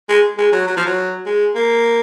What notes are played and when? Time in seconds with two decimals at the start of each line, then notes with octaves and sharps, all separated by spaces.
0.09 G#3
0.38 G#3
0.52 F#3
0.67 F#3
0.77 F3
0.86 F#3
1.26 G#3
1.55 A#3